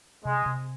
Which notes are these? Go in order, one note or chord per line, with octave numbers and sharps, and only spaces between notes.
C3 G#3
C3